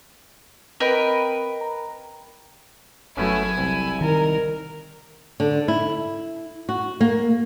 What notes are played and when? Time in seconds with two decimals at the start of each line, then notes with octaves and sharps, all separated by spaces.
0.80 C4 A#4 B4 D#5 G5 D7
1.61 A#5
3.17 G1 F#3 A3 B3 C#4 E4 G#5
3.58 C2
4.01 D#3 A#4
5.40 D3
5.68 E4
6.69 F#4
7.01 A#3